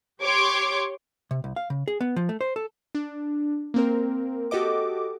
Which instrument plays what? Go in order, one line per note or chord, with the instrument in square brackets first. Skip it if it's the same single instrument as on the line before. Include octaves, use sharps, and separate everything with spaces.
[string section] G4 C#5 C6 D6
[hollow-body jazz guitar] C3
C2
F5
C#3
G#4
B3
F3
A3
C5
A4
[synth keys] D4
A#3 C4 A#4
F#4 G4 A4 D#5 D6